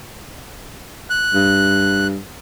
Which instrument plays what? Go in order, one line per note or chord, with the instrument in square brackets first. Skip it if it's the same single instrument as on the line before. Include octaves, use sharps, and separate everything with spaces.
[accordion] F#6
[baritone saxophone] G2